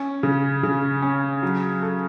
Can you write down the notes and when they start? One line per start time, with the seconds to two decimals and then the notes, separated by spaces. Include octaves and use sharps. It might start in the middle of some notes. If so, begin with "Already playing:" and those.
Already playing: C#4
0.23 C#3
0.63 C#3
1.02 C#4
1.43 F#3
1.82 A4